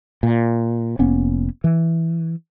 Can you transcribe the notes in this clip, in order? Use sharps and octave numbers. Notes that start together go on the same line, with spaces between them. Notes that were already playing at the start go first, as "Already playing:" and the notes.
A#2
F1 A#3 B3 C#4
E3